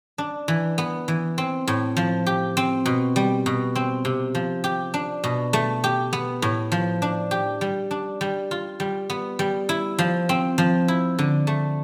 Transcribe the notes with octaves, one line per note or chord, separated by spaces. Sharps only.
D4
E3
B3
E3
C4
A2
F3
G4
C4
B2
G3
B2
C4
C3
F3
G4
D4
B2
A3
G4
B3
A2
F3
D4
G4
G3
D4
G3
F4
G3
B3
G3
E4
F3
C4
F3
E4
D3
A3